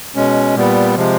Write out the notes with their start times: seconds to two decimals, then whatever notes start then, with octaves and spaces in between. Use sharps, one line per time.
0.15 B2 G#3 C#4
0.55 A#2 G3 B3
0.96 C3 F3 G#3